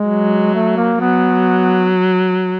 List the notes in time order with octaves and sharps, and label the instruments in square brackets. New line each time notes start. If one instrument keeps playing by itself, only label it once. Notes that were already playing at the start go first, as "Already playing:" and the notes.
Already playing: [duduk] G#3
[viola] F#3
[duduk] A3
A#3
[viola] F#3 [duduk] B3